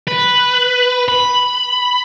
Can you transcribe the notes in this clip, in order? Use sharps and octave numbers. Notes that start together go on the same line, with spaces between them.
B4
B5